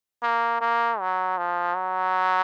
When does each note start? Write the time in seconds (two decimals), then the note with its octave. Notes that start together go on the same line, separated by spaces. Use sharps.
0.23 A#3
0.61 A#3
1.00 F#3
1.38 F3
1.76 F#3